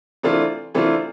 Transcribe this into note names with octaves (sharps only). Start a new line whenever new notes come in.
C3 E3 A3 D4 F4
C3 E3 A3 D4 F4